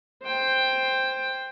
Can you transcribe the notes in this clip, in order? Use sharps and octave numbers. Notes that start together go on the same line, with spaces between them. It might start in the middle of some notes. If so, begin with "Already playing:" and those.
C5 G5